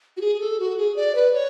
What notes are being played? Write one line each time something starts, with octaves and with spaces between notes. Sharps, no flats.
F#4
G#4
A4
F#4
G#4
D5
B4
C#5